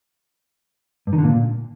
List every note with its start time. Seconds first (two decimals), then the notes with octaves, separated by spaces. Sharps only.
1.07 G2
1.13 D#3
1.18 D3
1.24 A#2